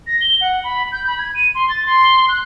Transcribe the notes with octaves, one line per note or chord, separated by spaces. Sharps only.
A#6
G7
F#5
B5
G6
B5
G#6
D#7
C6
A6
C6
F#6